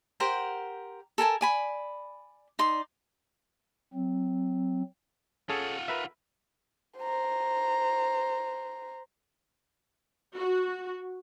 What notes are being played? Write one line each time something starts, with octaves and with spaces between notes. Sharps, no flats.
G4 A#4 C5 F#5
A4 A#4 G#5 A5
D5 G#5 B5
D#4 D5 C6
F#3 C4
C#4 F4 G#4 A4 F#5
A#4 B4 E5
C5 A#5
F#4